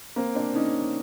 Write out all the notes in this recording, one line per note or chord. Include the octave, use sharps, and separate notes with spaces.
A#3 C4
C4 D4
C#4 D#4